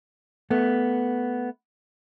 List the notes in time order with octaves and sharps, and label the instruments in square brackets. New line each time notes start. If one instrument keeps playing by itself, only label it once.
[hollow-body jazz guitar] A3 B3